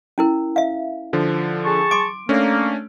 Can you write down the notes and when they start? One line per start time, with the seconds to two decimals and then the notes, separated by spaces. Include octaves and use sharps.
0.18 C#4 E4 A#4
0.56 E5 F5
1.13 D3 F3
1.64 G#4 A5 C#6
1.91 C6 D6 D7
2.29 A3 A#3 C#4 D4